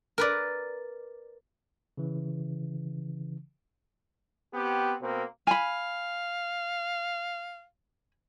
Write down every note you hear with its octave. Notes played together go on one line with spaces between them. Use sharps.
A#4 B4 D5
C#3 E3
B3 C4 G4
B2 A#3 C4
F5 G#5 B5